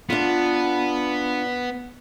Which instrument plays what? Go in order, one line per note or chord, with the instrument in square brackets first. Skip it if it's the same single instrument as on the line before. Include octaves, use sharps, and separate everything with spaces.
[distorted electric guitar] B3 [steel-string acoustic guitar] D4 F4